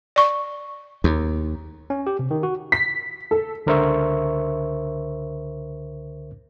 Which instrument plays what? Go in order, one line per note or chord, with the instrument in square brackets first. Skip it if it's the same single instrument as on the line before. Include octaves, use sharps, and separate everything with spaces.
[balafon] D5 C#6
[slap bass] D#2
[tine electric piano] C#4
G4
C3
D#3
F#4
[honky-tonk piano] B6
A4
[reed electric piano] C#2 D3 A#4 C5 E5 C#6